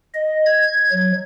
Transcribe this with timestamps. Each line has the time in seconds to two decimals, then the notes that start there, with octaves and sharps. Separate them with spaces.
0.14 D#5
0.45 G#6
0.92 F#3